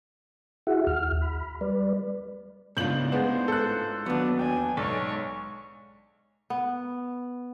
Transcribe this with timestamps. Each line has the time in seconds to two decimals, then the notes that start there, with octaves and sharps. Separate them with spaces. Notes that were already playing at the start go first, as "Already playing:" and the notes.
0.67 E4 F#4 G#4 E5 F#5
0.87 D#2 F6
1.22 B5
1.61 G3 B4 D5
2.77 A1 G#2 C#3 B3 D4 F4 G6 F#7
3.12 G#3 B3 D4 C5
3.48 A4 F#6
4.06 D#2 F#3 B3 D4
4.39 D4 G5 G#5
4.77 B1 G#2 A4 C#5 D5
6.50 B3